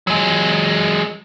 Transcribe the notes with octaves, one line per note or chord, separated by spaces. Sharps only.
F#3 G#3